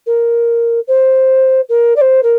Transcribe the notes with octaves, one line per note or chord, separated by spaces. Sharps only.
A#4
C5
A#4
D5
C5
A#4